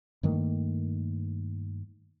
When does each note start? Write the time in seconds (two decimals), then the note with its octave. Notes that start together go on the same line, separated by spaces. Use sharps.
0.23 G2 D#3 A3 A#3